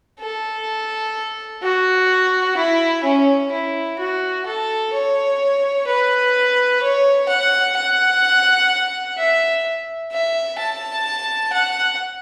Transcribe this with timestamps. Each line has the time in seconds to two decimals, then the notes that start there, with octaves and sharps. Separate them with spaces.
0.20 A4
1.63 F#4
2.57 E4
3.03 C#4
3.52 E4
3.98 F#4
4.46 A4
4.92 C#5
5.87 B4
6.82 C#5
7.28 F#5
7.76 F#5
9.18 E5
10.12 E5
10.59 A5
11.53 F#5